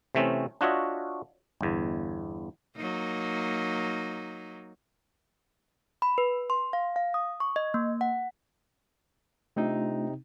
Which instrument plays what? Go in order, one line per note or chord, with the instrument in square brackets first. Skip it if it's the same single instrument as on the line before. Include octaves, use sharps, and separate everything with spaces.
[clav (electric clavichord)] C3 E3 A3 C4 C#4
D4 F4 F#4 C#5 D#5 E5
G1 E2
[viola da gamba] F#3 A#3 D#4
[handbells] B5
B4
C6
F5
F5
D#6
C#6
D#5
A#3
F#5
[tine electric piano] C3 C4 D#4 [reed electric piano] A3 D4 F4